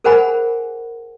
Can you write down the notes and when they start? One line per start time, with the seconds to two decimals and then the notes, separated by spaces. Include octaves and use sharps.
0.04 G#4 A#4 C5 F#5 G#5 B5